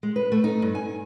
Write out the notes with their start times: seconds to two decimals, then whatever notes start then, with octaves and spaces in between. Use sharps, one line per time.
0.03 G#3
0.16 B4
0.32 A3
0.44 D#4
0.62 G2
0.75 G#5